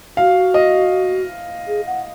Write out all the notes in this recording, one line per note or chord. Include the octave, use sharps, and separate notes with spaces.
F#4 F5
D#5
G#4
F#5